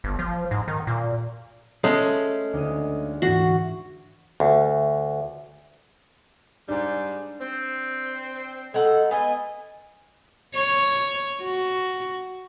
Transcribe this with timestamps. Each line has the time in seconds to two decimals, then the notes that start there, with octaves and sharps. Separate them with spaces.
0.04 G1
0.19 F3
0.51 G#2
0.68 D#3
0.87 A#2
1.84 G#3 A3 C#4
2.53 D2 D#4 D#5
3.22 G#2 E3 F#4
4.40 D2
6.68 G#2 G3 D4
7.40 C4
8.74 G#3 D#4 A4 F#5
9.11 B3 D#5 G#5
10.55 C#5
11.42 F#4